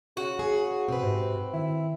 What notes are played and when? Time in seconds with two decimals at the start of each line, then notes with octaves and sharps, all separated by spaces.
0.17 C#3 F#4
0.39 G#4
0.88 B2 C4 B4
1.03 G#2 C3
1.53 D#3 E4